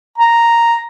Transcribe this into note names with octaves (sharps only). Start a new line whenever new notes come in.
A#5